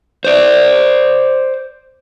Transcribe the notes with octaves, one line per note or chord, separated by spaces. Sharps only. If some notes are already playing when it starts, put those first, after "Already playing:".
C5 D5